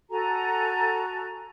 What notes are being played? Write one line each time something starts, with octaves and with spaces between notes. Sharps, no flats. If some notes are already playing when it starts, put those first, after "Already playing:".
F#4 A4 G#5 A#5